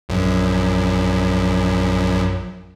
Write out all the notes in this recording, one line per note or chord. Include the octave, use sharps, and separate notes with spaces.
A#1 F#2